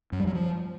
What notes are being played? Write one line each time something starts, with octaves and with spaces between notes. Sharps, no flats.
F#2
G3
F#3
F3